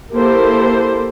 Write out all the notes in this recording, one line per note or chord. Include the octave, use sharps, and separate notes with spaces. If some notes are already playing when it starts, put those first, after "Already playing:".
A#3 E4 G4 A4 C5